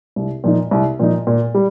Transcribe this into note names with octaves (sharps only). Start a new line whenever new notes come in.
C2
A#2 F3 D#4
C2
A#2 F3 D#4
A#2
G3